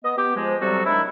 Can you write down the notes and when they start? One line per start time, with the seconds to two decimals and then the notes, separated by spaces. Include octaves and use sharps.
0.04 B3 D#5
0.17 B3 G4
0.36 F3 G#3
0.61 C3 F#3 G3 C4 F#4 A4
0.86 D#3 F#3 G#3 D4 E4